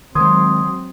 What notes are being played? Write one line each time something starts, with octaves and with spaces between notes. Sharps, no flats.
D#3 F#3 G#3 C4 C6 D#6 G#6